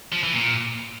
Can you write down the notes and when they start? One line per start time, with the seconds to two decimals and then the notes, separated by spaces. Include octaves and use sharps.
0.12 F3
0.23 E3
0.34 A#2